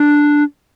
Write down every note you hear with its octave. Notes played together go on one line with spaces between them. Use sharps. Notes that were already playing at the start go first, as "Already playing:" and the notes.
Already playing: D4